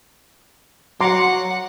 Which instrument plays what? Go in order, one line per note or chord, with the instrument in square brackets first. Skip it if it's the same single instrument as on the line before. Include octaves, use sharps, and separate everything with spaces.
[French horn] F#3 [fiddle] F#5 [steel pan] A#5 C6 D6